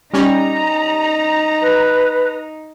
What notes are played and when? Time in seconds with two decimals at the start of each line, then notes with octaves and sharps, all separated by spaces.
0.14 G3 C#4 D#4 A#5
1.62 B4